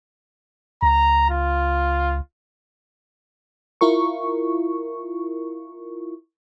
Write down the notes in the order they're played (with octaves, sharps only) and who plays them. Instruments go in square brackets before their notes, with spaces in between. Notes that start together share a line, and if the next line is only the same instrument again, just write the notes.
[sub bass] C#2 [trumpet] A#5
[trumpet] F4
[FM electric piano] E4 F4 A#4 C#6